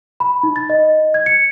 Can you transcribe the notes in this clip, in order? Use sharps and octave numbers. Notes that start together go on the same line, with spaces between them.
B5
D#4
A6
D#5
G#6
C#7